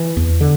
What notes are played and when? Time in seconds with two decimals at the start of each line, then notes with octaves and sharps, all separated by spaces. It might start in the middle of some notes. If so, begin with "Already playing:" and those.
Already playing: E3
0.17 E2
0.41 D3